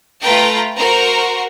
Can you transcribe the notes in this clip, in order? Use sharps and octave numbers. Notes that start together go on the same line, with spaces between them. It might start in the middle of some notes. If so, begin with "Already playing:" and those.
A3 F4 B4 G5 A#5
F#4 A#4 C5 A#5